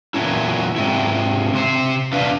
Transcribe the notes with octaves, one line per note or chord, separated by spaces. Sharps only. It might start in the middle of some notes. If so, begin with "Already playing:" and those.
E2 A#2 F3 F#3 C#4 E4
G#2 C3 E4
C3 C5
E2 D4 B4 F5